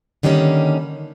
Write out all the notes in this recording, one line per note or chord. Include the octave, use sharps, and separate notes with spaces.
D3 D#3 G3 A#3 C#4